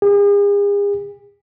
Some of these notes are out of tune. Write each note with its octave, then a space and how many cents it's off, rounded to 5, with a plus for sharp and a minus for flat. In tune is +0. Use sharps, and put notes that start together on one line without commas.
G#4 -45